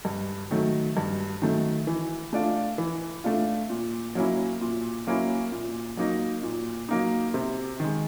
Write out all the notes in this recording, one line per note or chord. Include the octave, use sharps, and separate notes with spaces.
G2
D#3 F#3 A3
G2
D#3 F#3 A3
E3
A3 D4 F4
E3
A3 D4 F4
A#2
F#3 A#3 C#4 E4
A#2
F#3 A#3 C#4 E4
A#2
F#3 A#3 D#4
A#2
F#3 A#3 D#4
C3
D#3 G#3